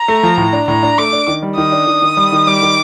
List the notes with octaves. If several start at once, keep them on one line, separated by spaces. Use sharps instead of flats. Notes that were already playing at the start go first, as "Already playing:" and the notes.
Already playing: A#5
A3
F3
A2
D4
A2 A#5
D4
A3 D6
D4
D#3
G3
D#3 D#6
D4
D#3
D#3
G3
D#3
G3 D6
D#3